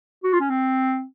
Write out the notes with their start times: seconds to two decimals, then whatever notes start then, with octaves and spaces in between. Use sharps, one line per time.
0.24 F#4
0.33 F4
0.40 C#4
0.50 C4